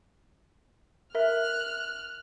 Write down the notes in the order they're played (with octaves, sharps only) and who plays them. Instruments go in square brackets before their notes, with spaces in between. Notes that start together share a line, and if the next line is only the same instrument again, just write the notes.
[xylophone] A#4 E5 [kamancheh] F6 F#6